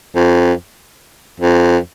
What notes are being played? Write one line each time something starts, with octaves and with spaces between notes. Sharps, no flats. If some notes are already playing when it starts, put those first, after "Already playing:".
F2
F2